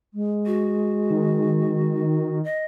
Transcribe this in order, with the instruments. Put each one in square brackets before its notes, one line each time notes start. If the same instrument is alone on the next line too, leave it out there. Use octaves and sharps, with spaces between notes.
[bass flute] G#3
[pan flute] F#4
[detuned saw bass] D#3
[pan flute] D#5